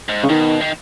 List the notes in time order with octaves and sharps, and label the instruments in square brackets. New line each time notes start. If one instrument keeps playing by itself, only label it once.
[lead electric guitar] G#2
[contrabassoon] C#3
[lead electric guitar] B2 [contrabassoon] D#3
[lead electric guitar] D#3